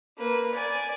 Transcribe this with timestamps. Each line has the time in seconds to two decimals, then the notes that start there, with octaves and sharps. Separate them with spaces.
0.18 A#3 B4
0.54 D5 G#5